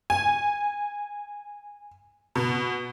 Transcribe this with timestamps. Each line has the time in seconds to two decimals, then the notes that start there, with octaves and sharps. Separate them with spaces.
0.10 G#5
2.35 B2